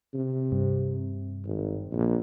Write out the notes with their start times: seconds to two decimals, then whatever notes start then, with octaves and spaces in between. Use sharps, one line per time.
0.14 C3
0.52 G2
1.46 G#1
1.93 A#1